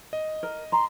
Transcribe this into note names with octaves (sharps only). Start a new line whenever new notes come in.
D#5
A#4
A#5 C6